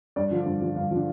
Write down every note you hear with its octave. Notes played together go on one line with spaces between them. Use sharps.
G2 D5
D3 F3
G2
D3 F3
G2 F5
D3 F3